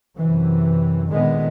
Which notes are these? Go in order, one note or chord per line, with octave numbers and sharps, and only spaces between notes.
F#2 C3 E3
A#2 D3 D#3 G#3 B3